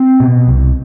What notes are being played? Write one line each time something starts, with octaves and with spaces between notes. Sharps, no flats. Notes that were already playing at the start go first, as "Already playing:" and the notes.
Already playing: C4
B2
C2